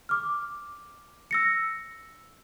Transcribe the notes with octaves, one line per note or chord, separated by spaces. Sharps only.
D6 F6
E6 A#6 C#7